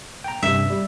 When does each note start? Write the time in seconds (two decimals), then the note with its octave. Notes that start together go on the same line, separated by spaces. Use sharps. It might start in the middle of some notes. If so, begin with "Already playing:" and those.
0.24 G5 A#5
0.43 G2 C3 E5
0.70 G3